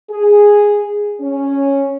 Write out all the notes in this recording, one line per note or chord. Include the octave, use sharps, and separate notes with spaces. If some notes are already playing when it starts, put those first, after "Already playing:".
G#4
C#4